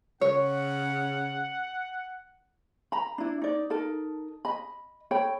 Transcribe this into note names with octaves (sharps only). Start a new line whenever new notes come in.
C#3 C#5 F#5
A#5 B5
D4 E4
D#4 D5
D#4 A4 A#4 A5
D#5 B5
A4 C#5 G5 B5